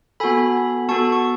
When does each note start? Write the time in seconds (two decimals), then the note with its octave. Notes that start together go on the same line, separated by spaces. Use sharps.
0.20 B3 F#4 A4 G#5 B5
0.89 B3 F#4 A4 A5 C#6
1.12 C#6